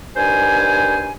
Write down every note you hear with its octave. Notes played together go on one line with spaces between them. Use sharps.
G2 D#3 C5 G#5